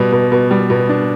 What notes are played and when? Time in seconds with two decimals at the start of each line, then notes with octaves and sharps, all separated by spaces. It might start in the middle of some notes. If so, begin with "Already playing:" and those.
Already playing: B2 G3
0.12 B2
0.32 B2
0.51 G3
0.70 B2
0.89 D4